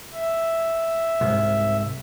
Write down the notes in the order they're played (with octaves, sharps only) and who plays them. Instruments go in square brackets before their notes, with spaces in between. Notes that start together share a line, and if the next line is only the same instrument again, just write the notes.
[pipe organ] E5
[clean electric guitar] C2 G#2